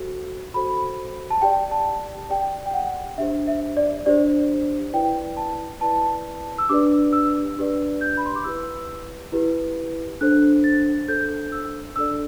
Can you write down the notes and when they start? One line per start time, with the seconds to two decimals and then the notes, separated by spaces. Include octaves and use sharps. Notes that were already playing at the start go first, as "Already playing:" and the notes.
Already playing: F#4 A4 C5
0.54 F#4 A4 C5 B5
1.30 A5
1.42 G4 D5 G5
1.71 A5
2.30 G4 D5 G5
2.66 G5
2.74 F#5
3.18 D4 G4 C5 E5
3.47 E5
3.77 D5
4.06 D4 G4 C5 D5
4.93 E4 B4 D5 G5
5.37 A5
5.81 E4 B4 D5 A5
6.58 E6
6.69 D4 G4 B4 D5 D6
7.13 E6
7.57 D4 G4 B4 D5
8.01 G6
8.17 B5
8.26 C6
8.35 D6
8.44 E4 G4 B4 E6
9.32 E4 G4 B4
10.21 D4 A4 C5 F#6
10.64 A6
11.08 D4 A4 C5 G6
11.52 E6
11.96 D4 A4 D5 E6